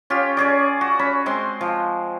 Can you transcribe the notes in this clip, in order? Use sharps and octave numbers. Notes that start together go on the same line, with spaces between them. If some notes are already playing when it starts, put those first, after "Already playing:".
C#4 F4 G4
C#4 G#4 D5
F#4
C#4 B5
G#3 C4 C6
F3